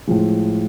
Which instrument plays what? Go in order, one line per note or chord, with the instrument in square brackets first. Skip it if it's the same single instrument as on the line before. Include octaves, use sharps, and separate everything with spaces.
[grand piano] A2 F3 G#3